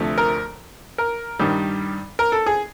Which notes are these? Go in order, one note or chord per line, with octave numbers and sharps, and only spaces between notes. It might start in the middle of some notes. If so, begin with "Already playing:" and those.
Already playing: D2 C3 F3 A3
A#4
A#4
G2 D#3 G3
A#4
A4
G#4